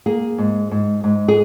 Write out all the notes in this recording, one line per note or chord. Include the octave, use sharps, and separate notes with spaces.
A#3 G#4
G#2
G#2
G#2
G#4